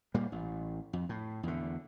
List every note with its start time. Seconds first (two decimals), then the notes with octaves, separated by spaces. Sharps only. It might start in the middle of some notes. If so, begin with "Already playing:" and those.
0.14 A#2 G3 A#3
0.32 A1
0.93 F2
1.09 A2
1.43 E2 D3